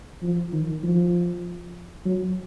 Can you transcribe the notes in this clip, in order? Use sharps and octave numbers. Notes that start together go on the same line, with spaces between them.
F3
D#3
F3
F#3